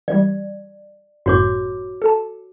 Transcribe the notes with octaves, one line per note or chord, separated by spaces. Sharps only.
E3 G3 D5
G1 F#2 A2 F#4 C#5 D6
A4 A5